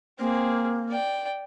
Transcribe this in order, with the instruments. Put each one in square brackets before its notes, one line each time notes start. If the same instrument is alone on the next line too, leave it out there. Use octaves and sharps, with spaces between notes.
[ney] A#3 [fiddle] C4 G#4
[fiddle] D5 G5